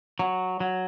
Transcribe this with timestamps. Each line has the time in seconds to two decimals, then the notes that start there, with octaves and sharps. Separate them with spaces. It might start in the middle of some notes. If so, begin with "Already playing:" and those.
0.19 F#3
0.60 F#3